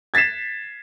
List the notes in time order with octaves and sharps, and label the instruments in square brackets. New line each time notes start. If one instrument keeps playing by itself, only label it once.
[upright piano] G#6 A6 B6 C7 E7